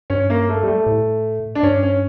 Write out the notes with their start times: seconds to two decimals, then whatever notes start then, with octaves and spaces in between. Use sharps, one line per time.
0.10 G2 C#4
0.30 A#3
0.49 A3
0.63 G3
0.67 A3
0.86 A2
1.55 D4
1.63 G2 C#4
1.83 C#4